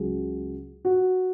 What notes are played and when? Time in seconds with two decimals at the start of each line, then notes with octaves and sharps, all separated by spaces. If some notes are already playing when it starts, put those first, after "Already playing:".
Already playing: C#2 C#3 F#3 G#4
0.85 F#4